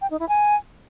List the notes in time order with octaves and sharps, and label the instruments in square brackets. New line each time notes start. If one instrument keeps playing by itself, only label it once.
[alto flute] G5
D#4
E4
G#5